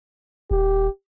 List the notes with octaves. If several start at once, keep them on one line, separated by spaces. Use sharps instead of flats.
D#1 G4